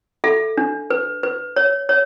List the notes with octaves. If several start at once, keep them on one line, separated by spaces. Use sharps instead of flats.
A4 E5
D4
B4
B4
C#5
C#5